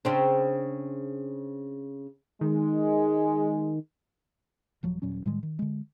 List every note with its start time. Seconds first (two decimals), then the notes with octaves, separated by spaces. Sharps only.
0.05 C#3 C4 D4
2.41 D#3 G#3
4.83 D#1 F3 F#3
5.02 D#1 A#2 F#3 C#4
5.26 A2 D#3 G3 G#3
5.43 D#3
5.59 D3 G#3